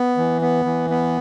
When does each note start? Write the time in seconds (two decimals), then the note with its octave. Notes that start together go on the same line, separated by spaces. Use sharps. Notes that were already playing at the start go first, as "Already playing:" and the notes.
Already playing: B3
0.17 E3
0.41 B3
0.65 E3
0.90 B3